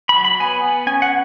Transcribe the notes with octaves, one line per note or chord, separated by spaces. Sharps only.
B5
F#3
B5
B3 G#5
B3
C#4 G#5
F#5